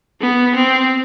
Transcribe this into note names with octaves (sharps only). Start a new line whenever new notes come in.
B3
C4